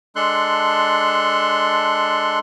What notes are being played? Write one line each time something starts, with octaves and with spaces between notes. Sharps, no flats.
G#3 D4 A4 C6 F#6